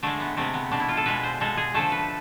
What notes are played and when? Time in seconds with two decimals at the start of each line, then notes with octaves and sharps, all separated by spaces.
0.03 D3 G#3 A3
0.20 B3
0.37 C3 G#3 A3
0.54 B3
0.71 B2 A3 D4
0.80 E4
0.89 F4
0.97 A4
1.06 B2 G#3 B4
1.23 C5
1.40 B2 G#3 A4
1.57 G#4
1.74 D3 F3 A3 A4
1.92 B4